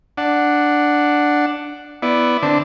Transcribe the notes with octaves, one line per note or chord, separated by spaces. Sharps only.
D4 F#5
B3 E4 D5
D3 C4 D4